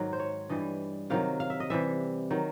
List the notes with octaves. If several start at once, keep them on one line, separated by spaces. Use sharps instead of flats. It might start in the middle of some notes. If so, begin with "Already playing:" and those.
Already playing: G#2 D#3 F#3
C5
C#5
G2 E3 G3 D#5
C3 D#3 F#3 F5
F5
E5
D#5
C3 E3 G3 E5
D#3 F#3